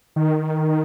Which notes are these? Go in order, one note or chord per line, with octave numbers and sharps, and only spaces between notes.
D#3